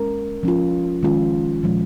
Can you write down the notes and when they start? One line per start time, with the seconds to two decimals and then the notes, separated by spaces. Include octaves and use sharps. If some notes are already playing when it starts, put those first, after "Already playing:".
Already playing: G#3 C#4 A#4
0.43 F3 C#4 F4
1.03 D#3 G#3 C#4 F4
1.63 A#2 F3 G#3